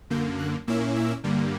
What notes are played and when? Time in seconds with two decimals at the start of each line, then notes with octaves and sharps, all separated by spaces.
0.10 F#2 D3 A#3 G6
0.39 F#6
0.67 A#2 A#3 C#4 E4 E6
0.96 E6
1.24 G2 D3 G3 A#3